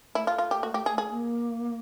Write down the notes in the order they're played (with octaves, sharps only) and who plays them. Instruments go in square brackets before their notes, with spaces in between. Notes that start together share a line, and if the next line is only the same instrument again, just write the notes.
[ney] A3 [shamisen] E4
[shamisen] F4
F4
G4
F#4
G4
G#4
G#4
[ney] A#3